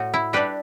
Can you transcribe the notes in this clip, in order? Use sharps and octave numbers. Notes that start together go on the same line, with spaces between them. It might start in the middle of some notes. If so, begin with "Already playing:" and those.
Already playing: A2 F#4
E4
G3 D4 G4 B4